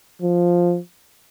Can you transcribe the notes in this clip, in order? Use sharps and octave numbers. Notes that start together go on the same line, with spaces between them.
F3